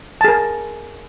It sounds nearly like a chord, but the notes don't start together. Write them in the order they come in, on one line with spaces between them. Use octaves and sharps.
A5 G#4 A#4